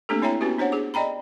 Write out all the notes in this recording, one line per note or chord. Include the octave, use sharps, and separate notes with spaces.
A3 A#3 C4 D4 G4 A4
C4 E4 C#5 E5 G5 A#5
B3 C#4 E4 F#4 G4 B4
D4 C5 C#5 F#5
D4 G#4 D6
D5 D#5 G5 A#5 B5